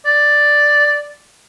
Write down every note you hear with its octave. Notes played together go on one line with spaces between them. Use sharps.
D5